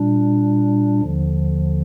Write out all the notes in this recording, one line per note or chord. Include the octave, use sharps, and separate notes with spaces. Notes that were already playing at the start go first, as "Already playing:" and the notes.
Already playing: A#2 G3 D4
D#2 D3 F3